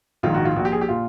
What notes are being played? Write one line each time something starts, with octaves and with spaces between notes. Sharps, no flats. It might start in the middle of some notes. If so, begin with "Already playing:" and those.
A#1 G#2 D#3 F4
F#4
F4
A#1 A#2 F#4
G4
G#4
G4
A#2 F4